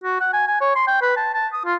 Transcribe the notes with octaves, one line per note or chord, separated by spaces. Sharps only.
F#4
F#5
G#5
G#5
C#5
C6
G5
B4
A5
A5
D#6
F4